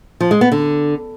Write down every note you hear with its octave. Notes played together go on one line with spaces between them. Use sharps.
F3
G#3
B3
D3